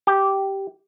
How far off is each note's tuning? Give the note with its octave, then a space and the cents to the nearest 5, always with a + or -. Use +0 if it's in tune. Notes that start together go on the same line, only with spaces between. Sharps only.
G4 -5